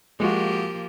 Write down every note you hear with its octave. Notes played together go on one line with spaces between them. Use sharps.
F3 G#3 A#3 F#4 G4